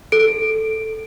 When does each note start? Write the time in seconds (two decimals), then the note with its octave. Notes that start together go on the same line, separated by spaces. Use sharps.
0.12 A4 D7